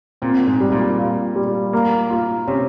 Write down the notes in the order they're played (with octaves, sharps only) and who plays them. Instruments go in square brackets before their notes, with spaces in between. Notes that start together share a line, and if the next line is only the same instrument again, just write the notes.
[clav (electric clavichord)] A#2 [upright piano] C4
[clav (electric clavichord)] G#2
[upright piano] G3
[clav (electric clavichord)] A#2
[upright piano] F4
G3
A#3
F4
[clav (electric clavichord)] C3 [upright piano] C#4